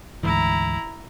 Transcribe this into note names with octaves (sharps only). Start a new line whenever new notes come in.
D2 G#2 E3 E4 A#5